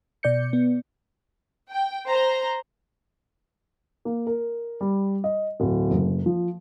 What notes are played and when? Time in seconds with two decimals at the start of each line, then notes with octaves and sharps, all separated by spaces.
0.23 B2 D5 G6 C#7
0.53 B3
1.70 G5
2.07 C5 A#5
4.05 A#3
4.27 A#4
4.81 G3
5.24 D#5
5.60 D1
5.90 F#1
6.26 F3